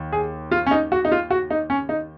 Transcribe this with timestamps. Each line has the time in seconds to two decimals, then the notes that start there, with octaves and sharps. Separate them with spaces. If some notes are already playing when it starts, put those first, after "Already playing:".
Already playing: D#2
0.12 G#4
0.51 F4
0.66 C#4
0.71 D#4
0.92 F#4
1.05 D#4
1.12 F4
1.30 F#4
1.50 D#4
1.70 C#4
1.89 D#4